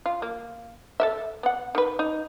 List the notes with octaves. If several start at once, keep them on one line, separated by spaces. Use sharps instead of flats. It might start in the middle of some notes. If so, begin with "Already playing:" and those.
F4
A#3
A4 A#4 E5
B3 F#5
D#3 B4
D#4